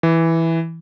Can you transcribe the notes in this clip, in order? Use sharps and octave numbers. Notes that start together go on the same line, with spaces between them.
E3